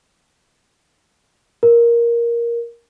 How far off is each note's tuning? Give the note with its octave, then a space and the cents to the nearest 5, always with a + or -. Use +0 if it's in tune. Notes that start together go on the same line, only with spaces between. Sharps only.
A#4 +10